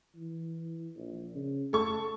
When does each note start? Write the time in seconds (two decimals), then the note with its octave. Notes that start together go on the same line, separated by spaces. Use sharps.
0.16 E3
0.96 A#1
1.35 C#3
1.73 A3 A4 C#6